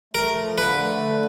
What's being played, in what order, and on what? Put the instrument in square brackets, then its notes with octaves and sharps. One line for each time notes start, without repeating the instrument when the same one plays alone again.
[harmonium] A3 [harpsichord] A#4
[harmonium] F3
[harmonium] D3 [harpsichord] B4
[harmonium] A3
D3